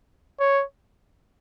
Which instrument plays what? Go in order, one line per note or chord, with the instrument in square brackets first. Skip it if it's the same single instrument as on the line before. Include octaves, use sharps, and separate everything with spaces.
[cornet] C#5